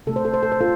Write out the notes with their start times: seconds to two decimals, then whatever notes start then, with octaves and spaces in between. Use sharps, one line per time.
0.07 C3 A3 A4
0.16 C5
0.25 A4
0.34 C5
0.43 A4
0.52 C5
0.61 F4 A4